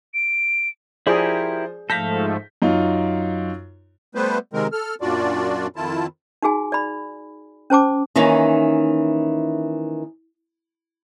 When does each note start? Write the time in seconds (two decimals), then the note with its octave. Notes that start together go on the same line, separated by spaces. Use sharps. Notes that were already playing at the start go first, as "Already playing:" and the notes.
0.14 D7
1.07 F3 E4 G4 G#4 A#4 C5 D5
1.90 G#2 F3 A3 A4 F5 G6 A#6 B6
2.62 F#2 D#4 F4
4.15 G3 A3 B3 B4 C5
4.53 C3 D#3 G#3 C4 A#4
4.72 A4 F6
5.01 F#2 A#2 D4 F4 F#4 D5
5.76 F2 D#3 E4 F4 A5
6.42 D#4 F#4 G#4 G#5
6.72 D5 B5
7.70 C#4 C5 A5 D6
8.16 D#3 E3 A#3 C#4 D#4